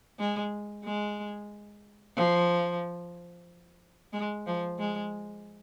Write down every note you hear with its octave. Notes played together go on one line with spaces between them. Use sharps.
G#3
G#3
F3
G#3
F3
G#3